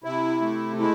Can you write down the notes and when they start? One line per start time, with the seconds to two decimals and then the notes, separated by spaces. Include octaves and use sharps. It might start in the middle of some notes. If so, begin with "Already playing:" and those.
0.04 C3 E4
0.41 A3
0.79 G#3 E4